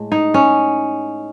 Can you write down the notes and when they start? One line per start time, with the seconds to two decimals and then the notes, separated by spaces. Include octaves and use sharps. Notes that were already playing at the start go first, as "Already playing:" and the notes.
Already playing: A2 G#3
0.12 D#4
0.34 C#4